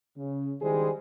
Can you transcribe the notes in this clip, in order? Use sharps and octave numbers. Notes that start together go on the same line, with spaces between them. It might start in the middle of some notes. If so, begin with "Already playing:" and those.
C#3
D#3 G3 G#3 E4 G#4 C5